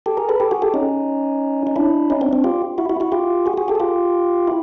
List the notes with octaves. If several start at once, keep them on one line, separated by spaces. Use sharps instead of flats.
G4 A4
G#4 A#4
A4 B4
G4 A4
F#4 G#4
G4 A4
C#4 D#4
D#4
D4 E4
C#4 D#4
C4 D4
C4 D4
F4 G4
E4 F#4
E4 F#4
E4 F#4
F4 G4
F#4 G#4
F#4 G#4
G4 A4
G#4
F4 G4
E4